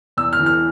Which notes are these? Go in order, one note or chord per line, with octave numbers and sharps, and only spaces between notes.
E2 E6
F6
E3
F6